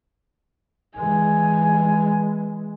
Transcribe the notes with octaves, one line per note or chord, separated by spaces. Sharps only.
E3 G#3 G#5